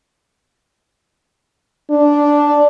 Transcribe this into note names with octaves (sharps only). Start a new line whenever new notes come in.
D4